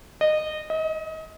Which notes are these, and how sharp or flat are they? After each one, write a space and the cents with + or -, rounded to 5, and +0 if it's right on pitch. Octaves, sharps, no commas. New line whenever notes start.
D#5 -20
D#5 +30